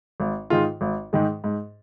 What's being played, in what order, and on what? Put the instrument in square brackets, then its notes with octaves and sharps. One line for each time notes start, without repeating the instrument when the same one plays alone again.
[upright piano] G#1
G#2 D#3 G#3 F4
G#1
G#2 D#3 G#3
G#2